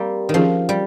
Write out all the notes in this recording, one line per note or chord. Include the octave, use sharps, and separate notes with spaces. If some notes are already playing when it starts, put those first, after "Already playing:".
Already playing: G3 A#3 C4
D#3
F3 C#4 F4 G#4
G3